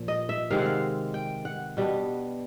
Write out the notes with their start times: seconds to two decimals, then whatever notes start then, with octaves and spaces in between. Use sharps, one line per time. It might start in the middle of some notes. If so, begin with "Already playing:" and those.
Already playing: A#2 F3
0.08 D#5
0.29 E5
0.50 C3 D#3 G#3 C4 F5
0.58 F#5
0.66 F5
1.14 G5
1.45 F#5
1.77 B2 G3 B3 D4